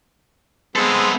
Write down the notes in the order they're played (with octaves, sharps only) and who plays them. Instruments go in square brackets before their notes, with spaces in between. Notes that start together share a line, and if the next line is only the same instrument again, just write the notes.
[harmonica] G#3 C4 [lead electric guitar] B3 A4